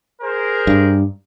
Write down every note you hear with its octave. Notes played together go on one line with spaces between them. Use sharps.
G#4 A#4 C5
G2